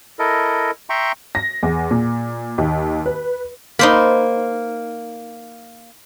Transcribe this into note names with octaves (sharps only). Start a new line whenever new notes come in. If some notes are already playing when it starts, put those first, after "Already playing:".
E4 A4 A#4 D#5
E5 G5 A#5 C6 C#6
A#6
E2
A#2
D#2
B4
A#3 D#4 C5 B5